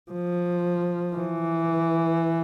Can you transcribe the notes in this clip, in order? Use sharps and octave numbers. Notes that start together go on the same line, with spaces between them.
F3
E3